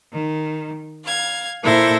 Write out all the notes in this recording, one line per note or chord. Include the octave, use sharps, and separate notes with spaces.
D#3
F5 G#6
A#2 E4 A4 C5 G#6 A#6